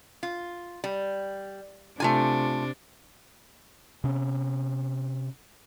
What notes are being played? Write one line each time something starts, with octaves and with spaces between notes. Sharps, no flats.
F4
G3
C3 A3 D4 F4 G#5
C3 B3 C#4